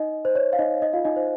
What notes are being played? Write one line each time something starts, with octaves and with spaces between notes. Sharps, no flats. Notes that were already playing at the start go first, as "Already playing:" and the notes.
Already playing: D#4 D#5
C5
C#5
F5
D#4 D#5
D#4 D#5
F4 F5
D#4 D#5
C5